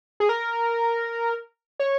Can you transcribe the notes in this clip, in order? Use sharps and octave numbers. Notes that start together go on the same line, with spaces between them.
G#4
A#4
C#5